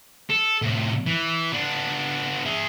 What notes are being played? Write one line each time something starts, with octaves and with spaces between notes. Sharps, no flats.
A4
A2 C3
E3
B3 D4
G#4 E5